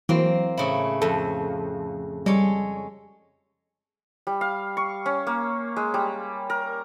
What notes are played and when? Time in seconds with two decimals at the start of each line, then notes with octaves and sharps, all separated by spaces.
0.09 E3 F#3 A#3 C4
0.57 A2 C#3 E4
1.02 F2 A4
2.26 G3 G#3 A4 C#5
4.27 G3
4.41 F5
4.77 C#6
5.06 C#4
5.27 A#3
5.76 G#3
5.94 G3
6.50 A#4